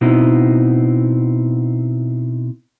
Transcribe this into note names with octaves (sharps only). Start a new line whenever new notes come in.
B2 B3 C4 D#4 E4